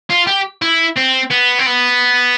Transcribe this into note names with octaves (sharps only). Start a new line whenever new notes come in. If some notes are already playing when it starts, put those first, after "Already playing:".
F4
G4
E4
C4
B3
C4
B3